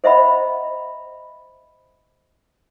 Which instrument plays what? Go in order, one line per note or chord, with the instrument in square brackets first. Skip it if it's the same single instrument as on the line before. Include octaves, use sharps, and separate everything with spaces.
[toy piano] C5 D#5 E5 F#5 A#5 B5